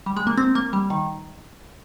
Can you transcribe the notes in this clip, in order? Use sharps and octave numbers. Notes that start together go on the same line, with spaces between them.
G3
G#3
A#3
C4
A#3
G3
D#3